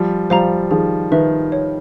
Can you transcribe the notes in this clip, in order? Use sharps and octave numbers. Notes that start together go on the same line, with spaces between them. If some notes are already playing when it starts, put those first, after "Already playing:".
Already playing: F3 G3
F3 G3 C5 F5 A#5
D#3 F3 G#4
D#3 B4 E5
C#5